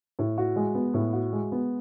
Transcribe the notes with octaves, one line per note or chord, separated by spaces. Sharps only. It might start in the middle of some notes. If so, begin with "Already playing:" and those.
A2
F#4
G#3
B3
A2
F#4
G#3
B3